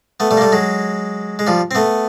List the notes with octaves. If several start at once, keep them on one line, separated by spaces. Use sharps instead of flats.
A3 B3
G3 A3
A#3
G3 A3
F#3 G#3
G#3
F3 G3
C4
A3 B3